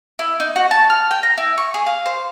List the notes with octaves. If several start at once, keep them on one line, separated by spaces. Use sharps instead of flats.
E4
D#4
F#4
A5
F6
G5
A#5
E4
C#6
G#4
F5
C5